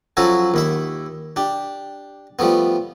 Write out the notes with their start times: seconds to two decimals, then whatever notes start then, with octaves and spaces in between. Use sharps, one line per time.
0.17 F3 F#3 C#4 E4 F#4 A4
0.54 D#2 E4 E5
1.36 D4 G4
2.39 F3 G3 A3 B3